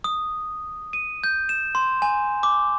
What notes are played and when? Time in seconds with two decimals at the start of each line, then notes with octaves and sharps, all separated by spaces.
0.04 D#6
0.93 D#7
1.24 G6
1.49 E7
1.75 C6
2.02 G#5
2.43 D6